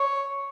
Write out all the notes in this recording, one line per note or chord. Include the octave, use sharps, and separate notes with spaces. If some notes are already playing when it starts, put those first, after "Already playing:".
Already playing: C#5